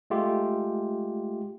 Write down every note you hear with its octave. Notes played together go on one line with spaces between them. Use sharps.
G#3 A3 F4 G4